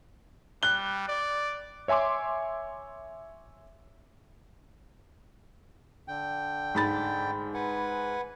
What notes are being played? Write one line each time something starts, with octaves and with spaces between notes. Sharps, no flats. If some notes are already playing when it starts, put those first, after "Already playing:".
G3 F#6 G7
D5
C#5 E5 G#5 C6 D6
D3 G5
G#2 B5 A6
B4 F#5 G#5